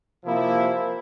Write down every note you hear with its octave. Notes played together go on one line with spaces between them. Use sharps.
C3 F3 A#3 E4